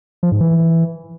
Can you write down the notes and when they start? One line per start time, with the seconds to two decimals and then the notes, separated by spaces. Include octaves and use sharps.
0.23 F3
0.32 G#2
0.40 E3